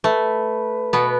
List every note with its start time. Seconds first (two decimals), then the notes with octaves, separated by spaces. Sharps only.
0.04 A3 B4
0.93 B2 B3